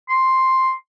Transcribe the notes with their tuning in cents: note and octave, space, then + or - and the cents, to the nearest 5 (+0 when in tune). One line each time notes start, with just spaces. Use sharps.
C6 +5